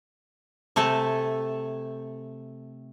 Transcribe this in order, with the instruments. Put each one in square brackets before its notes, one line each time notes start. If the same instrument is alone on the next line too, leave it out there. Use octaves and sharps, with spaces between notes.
[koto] C3 A3 A4 G#5 A5